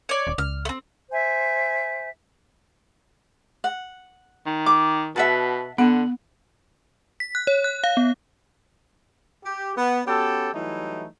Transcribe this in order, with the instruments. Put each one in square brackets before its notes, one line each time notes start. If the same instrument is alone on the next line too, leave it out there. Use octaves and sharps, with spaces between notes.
[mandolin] C#5 D5
[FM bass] D#1
[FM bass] C#2 [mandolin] F6
[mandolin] A3 C4
[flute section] C5 E5 G#5
[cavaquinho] F#5
[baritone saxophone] D#3
[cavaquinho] D6
[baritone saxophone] B2 [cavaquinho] E5 F#5 A5
[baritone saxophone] D3 [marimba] B3 [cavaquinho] F#5
[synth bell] B6
F#6
C#5
F#6
F5
B3
[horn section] G4
B3
B3 C#4 F#4 G4 A4
E3 F#3 G3 A3 D#4 E4